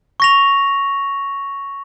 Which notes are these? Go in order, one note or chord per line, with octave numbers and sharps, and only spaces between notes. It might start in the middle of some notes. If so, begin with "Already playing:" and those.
C#6 A#6 F7